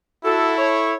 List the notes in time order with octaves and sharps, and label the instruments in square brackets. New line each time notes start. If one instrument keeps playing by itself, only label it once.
[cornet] E4 [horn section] F#4 A4
[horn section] A4 C#5